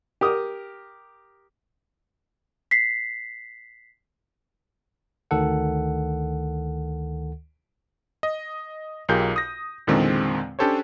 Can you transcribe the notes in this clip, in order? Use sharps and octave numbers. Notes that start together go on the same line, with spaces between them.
G4 A#4 D#6
B6 C7
D2 D#3 A4 F#5
D#5
B1 F4 G4 G#4 A#4 G6
D#6 A#6
E2 A#2 D3 D#3 G#3 C4
C#4 D4 G4 A4 C5 C#5